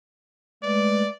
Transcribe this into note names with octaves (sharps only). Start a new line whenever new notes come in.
G#3 A3 B4 D5